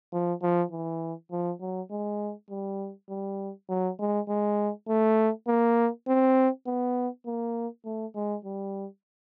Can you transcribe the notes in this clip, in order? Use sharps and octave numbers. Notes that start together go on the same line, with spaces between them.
F3
F3
E3
F3
F#3
G#3
G3
G3
F#3
G#3
G#3
A3
A#3
C4
B3
A#3
A3
G#3
G3